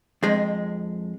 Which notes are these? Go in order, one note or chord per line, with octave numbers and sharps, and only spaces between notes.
F2 G#3